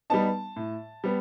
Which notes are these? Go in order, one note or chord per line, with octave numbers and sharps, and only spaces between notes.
G3 B3 D#4 A5
A2
G3 B3